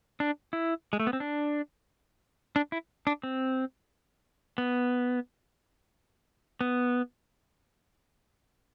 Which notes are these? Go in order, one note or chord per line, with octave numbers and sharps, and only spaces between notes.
D4
E4
G#3
A3
B3
C4
D4
D4
E4
D4
C4
B3
B3